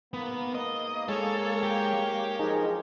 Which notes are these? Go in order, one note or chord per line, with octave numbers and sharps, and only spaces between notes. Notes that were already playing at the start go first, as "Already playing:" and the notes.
G#2 A#3 B3 A#4
D#5
G#3 A4 C#5
G4 G5
F3 F#3 G#3 D#4 G#4 A#4